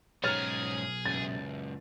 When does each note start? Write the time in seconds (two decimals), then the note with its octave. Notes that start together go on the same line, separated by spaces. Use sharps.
0.24 B1 G#2 C#4 G#4 C#5 A#5 F6 A6
1.05 C#2 F#2 A6